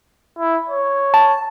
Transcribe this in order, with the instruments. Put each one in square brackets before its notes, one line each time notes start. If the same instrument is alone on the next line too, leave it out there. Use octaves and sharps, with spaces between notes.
[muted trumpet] E4
C#5
[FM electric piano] A5